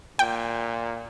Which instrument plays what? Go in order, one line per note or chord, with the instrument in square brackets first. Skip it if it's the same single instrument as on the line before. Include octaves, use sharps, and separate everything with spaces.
[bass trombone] A#2 [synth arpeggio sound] G5